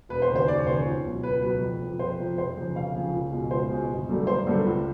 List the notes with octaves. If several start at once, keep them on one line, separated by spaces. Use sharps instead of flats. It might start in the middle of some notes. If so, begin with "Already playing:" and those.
E1 B4
C5
D#2 C#3
C5
E1 D5
C#5
D#2 C#3 C5
C#5
C#2
B2 F#3
C#2 B4
B2 F#3 B4
F2
C3 F3
F2 C5
C3 F3
F1 C5
F2 C#3
F1 F5
F2 C#3
C#2
B2 G#3
C#2 C5
B2 G#3
G1
G2 D3 F#3 A3
G1 C5
G2 D3 F#3 A3
C#2